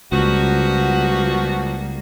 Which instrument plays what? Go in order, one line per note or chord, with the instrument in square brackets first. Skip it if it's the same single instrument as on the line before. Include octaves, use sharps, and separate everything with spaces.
[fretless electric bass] C#2 [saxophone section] F3 B3 F#4 [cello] G3 A#3